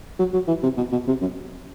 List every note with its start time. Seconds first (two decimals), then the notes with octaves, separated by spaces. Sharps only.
0.19 F#3
0.33 F#3
0.48 E3
0.63 C3
0.77 B2
0.92 B2
1.07 C3
1.21 F#2